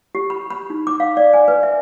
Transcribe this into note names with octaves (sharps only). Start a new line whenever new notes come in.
G4
B5
B5
D#4
D6
F5
D5
G#5
B4
E5